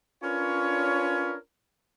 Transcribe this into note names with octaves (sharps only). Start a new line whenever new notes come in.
C#4 D4 F4 A#4 B4 C#5